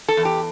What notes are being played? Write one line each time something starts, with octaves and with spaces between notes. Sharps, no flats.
A4
E2
G4